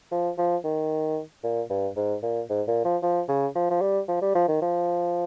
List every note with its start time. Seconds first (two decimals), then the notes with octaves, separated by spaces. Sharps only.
0.11 F3
0.38 F3
0.64 D#3
1.43 A#2
1.69 G2
1.96 G#2
2.22 A#2
2.49 G#2
2.67 A#2
2.84 F3
3.02 F3
3.28 C#3
3.55 F3
3.70 F3
3.81 G3
4.08 F3
4.21 G3
4.35 F3
4.48 D#3
4.61 F3